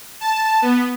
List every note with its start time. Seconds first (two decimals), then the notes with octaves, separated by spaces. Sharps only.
0.21 A5
0.62 B3